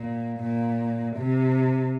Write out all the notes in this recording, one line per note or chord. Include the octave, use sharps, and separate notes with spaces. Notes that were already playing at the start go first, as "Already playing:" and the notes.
Already playing: A#2
A#2
C3